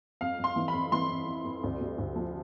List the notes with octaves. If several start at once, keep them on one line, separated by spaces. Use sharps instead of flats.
F2 F5
F2
C6
E3
B5
F2
E3 C6
F2
F2
F2
D2
C3
D2
F3